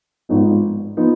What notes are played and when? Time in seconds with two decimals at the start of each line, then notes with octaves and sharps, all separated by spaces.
0.29 G#1 G#2 F3 B3 D#4
0.97 F3 B3 D#4